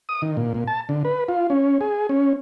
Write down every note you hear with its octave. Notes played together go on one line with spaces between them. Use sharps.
D#6
D#3
A#2
A#2
A5
D3
B4
F4
C#4
G#4
C#4